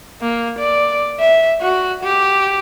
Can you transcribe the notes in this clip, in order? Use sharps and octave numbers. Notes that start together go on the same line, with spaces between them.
A#3
D5
E5
F#4
G4